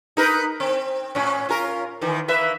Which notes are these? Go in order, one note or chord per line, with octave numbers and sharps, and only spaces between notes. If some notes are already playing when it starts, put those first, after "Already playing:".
D#4 A#4 B4
C4
A2 C#4
C#4 F4 A#4
D#3 E3
A#3 B4 E5